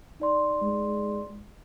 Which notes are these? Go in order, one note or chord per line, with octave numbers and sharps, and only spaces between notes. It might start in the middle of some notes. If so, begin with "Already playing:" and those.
D#4 D5 C6
G#3